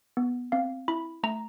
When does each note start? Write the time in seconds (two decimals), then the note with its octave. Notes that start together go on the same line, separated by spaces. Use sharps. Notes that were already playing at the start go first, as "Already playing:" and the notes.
0.17 B3
0.52 C4 F5
0.88 E4 B5
1.23 A3 A#5